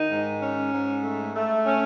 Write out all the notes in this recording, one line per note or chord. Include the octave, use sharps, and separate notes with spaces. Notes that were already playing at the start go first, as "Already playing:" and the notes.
Already playing: D#3 D#4
G#2
C#4
G#2
A3
A3
C#4